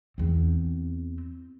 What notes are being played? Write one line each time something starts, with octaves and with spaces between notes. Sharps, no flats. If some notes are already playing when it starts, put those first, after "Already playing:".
E2 C4